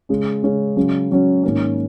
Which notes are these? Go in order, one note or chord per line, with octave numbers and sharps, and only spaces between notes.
C#3 G#3 C#4
C#3 G#3 C#4
C#3 F#3 C#4
C#3 F#3 C#4
G#2 D#3 A#3 C#4